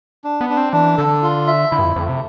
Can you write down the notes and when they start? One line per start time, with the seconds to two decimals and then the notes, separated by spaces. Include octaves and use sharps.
0.24 D4
0.41 B3
0.49 D4
0.57 C4
0.73 E3 D4
0.97 D3 A4
1.23 F4
1.47 E5
1.71 D3 E4
1.79 G2
1.84 F2
1.96 F2 A3
2.09 C3